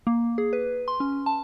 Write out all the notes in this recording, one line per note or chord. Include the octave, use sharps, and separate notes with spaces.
A#3
G#4
B4
C6
C#4
A5